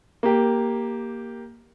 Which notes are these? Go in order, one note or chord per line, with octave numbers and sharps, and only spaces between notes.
A#3 G4